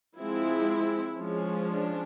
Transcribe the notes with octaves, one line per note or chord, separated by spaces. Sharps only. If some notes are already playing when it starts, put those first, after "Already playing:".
F3 G#3 C4 E4
F3 G#3 C#4
D4